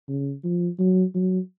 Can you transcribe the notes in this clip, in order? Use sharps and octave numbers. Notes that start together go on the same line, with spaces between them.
C#3
F3
F#3
F#3